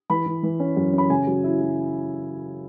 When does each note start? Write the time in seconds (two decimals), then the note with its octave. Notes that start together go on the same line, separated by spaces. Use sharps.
0.10 E3 B5
0.26 E3
0.43 E3
0.60 C#4
0.77 F#2
0.93 C#4 B5
1.10 C#3 G#5
1.27 F#3
1.44 E4
1.61 F#3